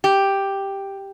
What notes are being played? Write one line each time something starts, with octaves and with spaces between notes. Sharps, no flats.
G4